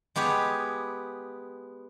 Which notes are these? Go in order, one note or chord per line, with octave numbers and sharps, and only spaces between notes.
G#3 B3 G4 C#5